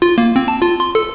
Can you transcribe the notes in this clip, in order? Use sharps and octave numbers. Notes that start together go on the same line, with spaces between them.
F4
A#3
C4
A5
F4
C6
A4